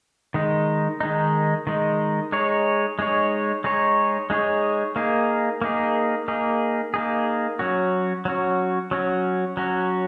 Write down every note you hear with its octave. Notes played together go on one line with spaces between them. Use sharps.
D#3 G#3 D#4
D#3 G#3 D#4
D#3 G#3 D#4
G#3 D#4 G#4 C#5
G#3 D#4 G#4 C#5
G#3 D#4 G#4 C#5
G#3 D#4 G#4 C#5
A#3 D#4 G#4
A#3 D#4 G#4
A#3 D#4 G#4
A#3 D#4 G#4
F#3 C#4 F#4
F#3 C#4 F#4
F#3 C#4 F#4
F#3 C#4 F#4